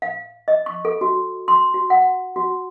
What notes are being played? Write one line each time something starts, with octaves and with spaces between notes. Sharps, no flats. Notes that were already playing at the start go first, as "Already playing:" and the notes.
F5
D#5
C#6
A4
F#4
C6
F#4
F#5
F#4